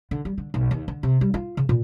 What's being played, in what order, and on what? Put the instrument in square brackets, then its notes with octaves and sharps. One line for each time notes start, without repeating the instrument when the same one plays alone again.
[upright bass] D3
G3
D3
B1
D#2
D3
C3
G3
F4
C#3
A#2